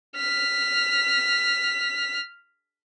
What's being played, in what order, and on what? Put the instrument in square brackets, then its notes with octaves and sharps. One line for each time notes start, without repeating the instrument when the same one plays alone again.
[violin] F6 B6